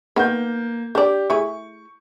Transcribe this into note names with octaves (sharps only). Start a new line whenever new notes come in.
D#3 A#3 B3 G6
D4 G4 D5
A3 E4 G#4 C#6